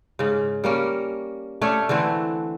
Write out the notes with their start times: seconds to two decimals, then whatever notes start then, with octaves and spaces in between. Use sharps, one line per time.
0.19 G#2 C#3
0.64 G3 A#3 C#4
1.62 A3 C#4 D4 C#5
1.89 D3 E3 A3 C4